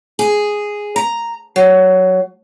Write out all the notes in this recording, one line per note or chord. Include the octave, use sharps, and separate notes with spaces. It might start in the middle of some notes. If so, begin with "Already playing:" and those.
G#4
A#5
F#3